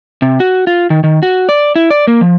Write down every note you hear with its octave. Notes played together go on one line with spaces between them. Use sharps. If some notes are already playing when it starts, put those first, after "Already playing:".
C3
F#4
F4
D#3
D#3
F#4
D5
E4
D5
A#3
F3